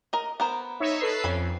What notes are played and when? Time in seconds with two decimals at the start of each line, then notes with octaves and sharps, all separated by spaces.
0.13 A#4 D#5
0.40 B3 A#4 C5
0.80 D#4 C#5 E5
1.00 A4 B4 C7
1.24 F2 C#4 B5